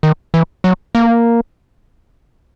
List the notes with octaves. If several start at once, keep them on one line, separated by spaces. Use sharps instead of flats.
D#3
E3
F#3
A#3